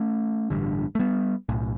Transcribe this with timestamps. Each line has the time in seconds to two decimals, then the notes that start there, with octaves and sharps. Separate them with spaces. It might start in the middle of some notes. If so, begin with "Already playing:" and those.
Already playing: A3 C#4
0.50 A1 G2 D3
0.95 A3
0.99 G3 B3
1.49 B1 A2